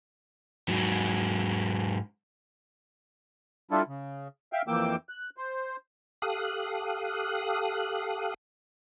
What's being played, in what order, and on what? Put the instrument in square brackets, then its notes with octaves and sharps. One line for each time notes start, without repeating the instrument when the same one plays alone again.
[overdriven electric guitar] G#2 F#3
[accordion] G3 D4 E4 F4 A4
C#3
E5 F5 G5
F2 E3 A#3 G5 D6 E6
F#6
C5
[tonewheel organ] G4 A4 F5 D#6 F#6